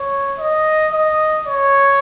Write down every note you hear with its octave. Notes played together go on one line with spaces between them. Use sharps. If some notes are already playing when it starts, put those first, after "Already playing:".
Already playing: C#5
D#5
D#5
C#5